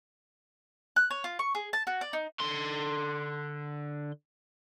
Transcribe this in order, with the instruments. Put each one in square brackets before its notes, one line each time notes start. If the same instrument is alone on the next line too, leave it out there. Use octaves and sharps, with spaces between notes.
[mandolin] F#6
C#5
F4
C#6
G#4
A5
F#4
D5
D#4
[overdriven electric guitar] D3 C6